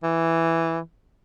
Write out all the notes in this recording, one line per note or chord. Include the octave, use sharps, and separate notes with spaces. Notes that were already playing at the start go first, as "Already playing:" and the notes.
E3